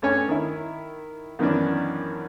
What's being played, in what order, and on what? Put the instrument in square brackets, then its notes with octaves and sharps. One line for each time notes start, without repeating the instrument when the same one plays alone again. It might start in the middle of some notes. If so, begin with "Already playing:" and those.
[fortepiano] G2 A3 C#4 C#5 G#5
D#3 E4
F#2 D#3 E3 B3 C#4 D4